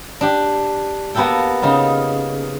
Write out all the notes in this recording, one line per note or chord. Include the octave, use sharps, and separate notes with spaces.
D4 G4
A#3 B3 F#4 G4 A4 G5
C#3 D#4 F4 G4